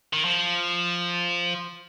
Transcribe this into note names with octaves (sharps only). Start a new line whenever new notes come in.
D#3
F3